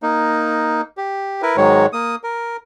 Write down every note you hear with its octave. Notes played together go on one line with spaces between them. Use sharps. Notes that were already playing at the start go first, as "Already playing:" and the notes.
A#3 D#4
G4
E4 A#4 B4
G#2 D#3 F#3 G#3 C#5
A#3 D#6
A#4